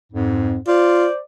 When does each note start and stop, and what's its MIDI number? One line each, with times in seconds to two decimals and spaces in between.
0.13 0.57 41
0.13 0.57 44
0.67 1.07 65
0.67 1.19 72
0.67 1.19 74